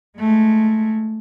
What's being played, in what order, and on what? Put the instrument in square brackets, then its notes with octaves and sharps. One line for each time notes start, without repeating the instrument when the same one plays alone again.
[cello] G#3 A3